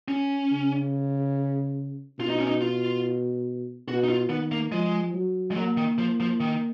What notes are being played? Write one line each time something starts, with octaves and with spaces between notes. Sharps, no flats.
C#4
C#3
B2 F4
D#4
C#4
D#4
F4
B2 F#4
D#4
F4
D#3 B3
A#3
F3 G#3
F#3
G#3
F#3 A#3
D#3
F3
F3
D#3